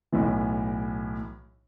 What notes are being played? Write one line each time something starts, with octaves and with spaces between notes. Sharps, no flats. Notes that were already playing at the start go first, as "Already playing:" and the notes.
B1 A2 E3